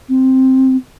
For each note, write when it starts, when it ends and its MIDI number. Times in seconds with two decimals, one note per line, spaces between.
0.09 0.76 60